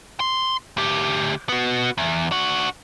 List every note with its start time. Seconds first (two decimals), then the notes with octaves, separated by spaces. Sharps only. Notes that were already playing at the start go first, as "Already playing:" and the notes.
0.20 C6
0.77 D2 G4
1.49 B3 F#4
1.98 E2
2.31 D4 F#4